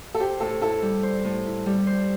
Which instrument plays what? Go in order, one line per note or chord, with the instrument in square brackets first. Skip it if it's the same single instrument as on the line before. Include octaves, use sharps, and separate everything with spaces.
[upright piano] A4
[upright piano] G4 [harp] C5
[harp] A2 [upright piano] A4
[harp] E4 [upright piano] A4
[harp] G3
C5
A2
E4
G3
C5